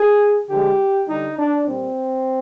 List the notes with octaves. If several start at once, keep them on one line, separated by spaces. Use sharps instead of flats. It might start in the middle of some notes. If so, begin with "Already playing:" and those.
Already playing: G#4
D3 F3 G#3 G4
D3 G3 D#4
D4
A#2 G3 C4